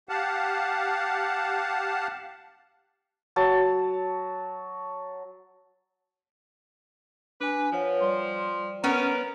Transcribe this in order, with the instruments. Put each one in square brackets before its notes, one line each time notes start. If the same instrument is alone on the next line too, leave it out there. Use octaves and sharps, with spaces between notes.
[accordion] G4 F5 F#5 A5
[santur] F#3 A5
[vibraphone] D4 G#5 [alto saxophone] B4
[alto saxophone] F3 [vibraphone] B4 C#5 F#5
[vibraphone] G3 D5 [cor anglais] C5
[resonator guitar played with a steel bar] B3 C#4 [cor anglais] A#4